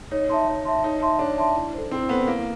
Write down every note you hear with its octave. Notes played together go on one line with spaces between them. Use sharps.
D#4 C#5
D#4 E5 A5 C6
C#5
E5 A5 C6
D#4 C#5
E5 A5 C6
D4 C#5
E5 A5 C6
E4
A4 C5
C4 E4
B3 A4 C5
A#3 E4